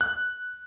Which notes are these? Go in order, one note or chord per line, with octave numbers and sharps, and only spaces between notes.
F#6